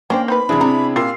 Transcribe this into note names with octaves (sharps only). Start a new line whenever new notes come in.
A#3 C#4 D4 C5 G5
C4 D#4 B4 B5
E2 C3 D4 E4 G#4
C3 A#5
A#2 F4 G4 A#4 F5 E6 C7